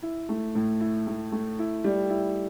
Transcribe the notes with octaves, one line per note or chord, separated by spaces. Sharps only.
E4
A3
A2
E4
A3
A3
E4
G3
E4